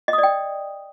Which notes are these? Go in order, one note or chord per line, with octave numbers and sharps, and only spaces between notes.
D#5
D#6
D5
G5